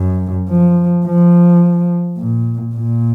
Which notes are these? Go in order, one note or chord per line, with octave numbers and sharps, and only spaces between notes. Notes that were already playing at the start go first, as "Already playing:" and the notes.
Already playing: F#2
F3
F3
A#2
A#2